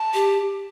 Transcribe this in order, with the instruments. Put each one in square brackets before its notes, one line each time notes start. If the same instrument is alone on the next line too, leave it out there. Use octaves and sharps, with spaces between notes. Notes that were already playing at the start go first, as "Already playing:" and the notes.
Already playing: [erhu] A5
[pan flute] G4